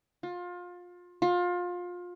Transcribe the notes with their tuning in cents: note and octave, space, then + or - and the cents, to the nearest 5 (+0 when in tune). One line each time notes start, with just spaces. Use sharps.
F4 +25
F4 +25